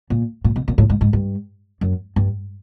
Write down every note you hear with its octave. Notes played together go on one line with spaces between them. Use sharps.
A#2
A#2
B2
A#2
A2
G#2
G#2
G2
F#2
G2